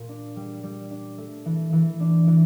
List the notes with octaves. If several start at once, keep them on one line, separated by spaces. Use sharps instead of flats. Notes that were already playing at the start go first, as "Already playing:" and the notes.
Already playing: A#2
D4
G3
G3
D4
A3
E3
E3
D4
E3